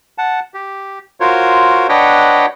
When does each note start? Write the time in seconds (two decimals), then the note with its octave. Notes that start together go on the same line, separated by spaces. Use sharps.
0.18 F#5 A5
0.54 G4
1.20 F4 F#4 A#4 C5 C#5
1.89 D4 B4 C#5 D#5 F#5 G5